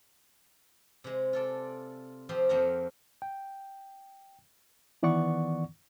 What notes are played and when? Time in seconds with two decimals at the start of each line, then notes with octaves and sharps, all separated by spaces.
1.04 C3 G#3
1.33 F4 A4 D5
2.29 F3 C4 G4 F5 C6
2.49 F2 A#3 C4 F5 F#5 A#5
3.22 G5
5.03 D#3 E3 B3 D5 F#5 C#6